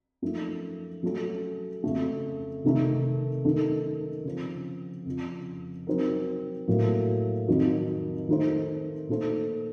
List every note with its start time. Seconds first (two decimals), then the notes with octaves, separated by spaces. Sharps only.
0.22 F#2 F3 A3 D#4
1.03 F#3 A3 C#4 F#4 A4
1.84 F2 C#3 A3
2.64 C3 D#3 A3 D#4 A4
3.44 F#2 D#3 A3 D#4 A4
4.25 C#3 F3 C4
5.06 F2 C#3 F3
5.87 F#3 C4 D#4 A#4
6.68 A2 F#3 A#3
7.48 F2 D#3 F#3
8.29 D#3 A3 D#4 A4 C5
9.09 A#2 A3 D#4 A4 C5